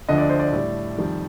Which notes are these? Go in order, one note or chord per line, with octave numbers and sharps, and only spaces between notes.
D2 D3 F3 D#5
D5
C5
D5
A2 G3
F2 D#3 G3